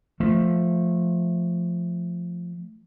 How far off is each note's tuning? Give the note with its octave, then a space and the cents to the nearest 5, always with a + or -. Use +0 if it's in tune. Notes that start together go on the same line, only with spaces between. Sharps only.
F3 +0 A3 +0